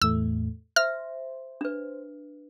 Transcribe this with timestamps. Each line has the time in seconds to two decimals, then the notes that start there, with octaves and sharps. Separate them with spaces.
0.02 E2 A2 A3 E6
0.76 C5 E5 F6
1.61 D4 B4